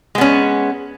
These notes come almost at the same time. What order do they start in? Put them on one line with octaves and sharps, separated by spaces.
G#3 B3 C#4